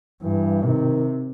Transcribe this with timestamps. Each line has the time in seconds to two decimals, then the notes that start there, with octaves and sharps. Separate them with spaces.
0.22 G2 E3
0.64 C3 D#3